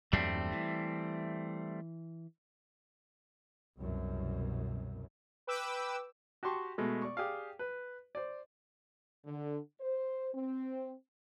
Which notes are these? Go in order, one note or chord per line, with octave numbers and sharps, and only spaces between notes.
E2 G2 F#3 G3 A3 C4
E3
C2 F#2 B2
B4 G5 D6 E6
F#4 G4 A5 C6 C#6
B2 G#3 A3
D5 C#6
G4 G#4 D5 F5
B4
C5 D5
D3
C5
C4